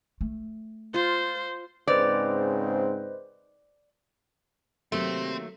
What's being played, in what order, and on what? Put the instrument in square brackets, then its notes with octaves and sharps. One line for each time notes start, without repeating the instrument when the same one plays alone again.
[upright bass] A3
[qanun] F4 [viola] C5
[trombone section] G#2 C#3 C4 [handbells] B4 C5 D#5 [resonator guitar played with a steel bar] D5
[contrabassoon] C3 [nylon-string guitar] D#3 F#3 A#3 [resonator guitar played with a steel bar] A3 [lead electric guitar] C4